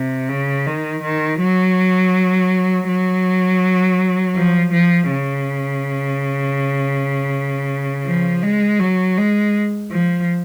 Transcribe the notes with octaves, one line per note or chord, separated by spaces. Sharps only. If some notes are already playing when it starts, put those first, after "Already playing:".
Already playing: C3
C#3
D#3
D#3
F#3
F#3
F3
F3
C#3
F3
G#3
F#3
G#3
F3